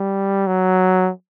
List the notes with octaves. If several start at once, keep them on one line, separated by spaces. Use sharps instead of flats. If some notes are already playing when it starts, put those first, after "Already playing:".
Already playing: G3
F#3